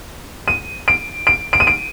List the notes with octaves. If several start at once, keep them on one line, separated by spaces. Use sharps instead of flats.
D#7
D7
D7
D7
D#7
D7